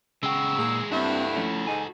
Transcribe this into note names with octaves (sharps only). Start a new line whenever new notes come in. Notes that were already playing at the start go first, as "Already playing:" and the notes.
C#3 G#3 F#4 G5 E6
A#2 A#3 D#4 G#4
G2 C4 D4 E4 F#4 A4 E5
F3 A3 C#4
G#2 D#4 G#5